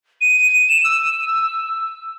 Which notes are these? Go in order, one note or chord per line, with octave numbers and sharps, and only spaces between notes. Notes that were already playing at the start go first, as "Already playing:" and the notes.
D#7
E7
E6